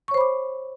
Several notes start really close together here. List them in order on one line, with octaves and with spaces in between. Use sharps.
C#6 C#5 C5 B5 D6